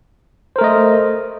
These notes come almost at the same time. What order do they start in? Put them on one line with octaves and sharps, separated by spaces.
C5 A#4 A3 D#5